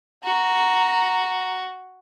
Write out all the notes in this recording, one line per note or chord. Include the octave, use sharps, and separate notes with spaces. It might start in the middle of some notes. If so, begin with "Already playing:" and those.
F#4 A#5